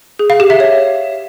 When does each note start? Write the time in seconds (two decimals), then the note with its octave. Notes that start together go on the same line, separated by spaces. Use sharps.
0.19 G#4
0.30 F5
0.40 G4
0.50 E5
0.60 C#5